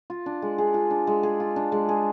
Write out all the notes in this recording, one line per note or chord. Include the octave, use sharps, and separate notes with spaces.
F4
D4
G#3
G#4
F4
D4
G#3
G#4
F4
D4
G#3
G#4